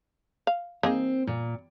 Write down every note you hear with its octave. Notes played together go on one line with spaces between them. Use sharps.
F5
A#3 C4 D#4 G#4
A#2